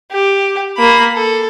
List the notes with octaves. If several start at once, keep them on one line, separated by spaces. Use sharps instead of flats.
G4
A#3 B5
A4